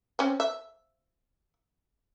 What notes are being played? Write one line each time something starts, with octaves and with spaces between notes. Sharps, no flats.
C4 C#4
E5